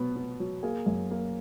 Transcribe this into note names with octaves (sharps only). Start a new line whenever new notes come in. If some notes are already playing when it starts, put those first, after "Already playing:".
Already playing: B2 F#3 B3
B3
F#3
A#3 G#4
F#2
A#3